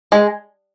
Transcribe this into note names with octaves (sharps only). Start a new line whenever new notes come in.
G#3